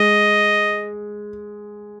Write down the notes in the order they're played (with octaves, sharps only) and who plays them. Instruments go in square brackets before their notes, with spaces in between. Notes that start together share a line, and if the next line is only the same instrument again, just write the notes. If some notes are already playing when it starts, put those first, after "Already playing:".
Already playing: [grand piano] G#3 [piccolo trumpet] D#5